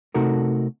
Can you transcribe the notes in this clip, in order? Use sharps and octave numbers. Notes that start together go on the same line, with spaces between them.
C3 A3 D#4 F#4 A4 A#4